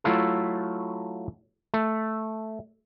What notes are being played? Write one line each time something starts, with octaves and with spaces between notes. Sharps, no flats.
F#3 A3 E4 F4 A4
A3